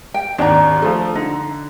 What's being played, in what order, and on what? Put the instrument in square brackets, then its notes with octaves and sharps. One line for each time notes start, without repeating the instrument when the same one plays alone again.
[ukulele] G5
[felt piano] G#1 D#2 [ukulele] D4 A#5
[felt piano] F3 A3
[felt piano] D3 [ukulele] D#4